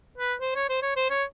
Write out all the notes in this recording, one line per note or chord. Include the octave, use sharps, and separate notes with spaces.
B4
C5
C#5
C5
C#5
C5
C#5